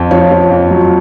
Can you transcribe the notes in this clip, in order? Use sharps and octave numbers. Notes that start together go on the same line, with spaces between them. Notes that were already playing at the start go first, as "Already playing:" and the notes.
Already playing: F2
F3 C#5
F3
F2
F#3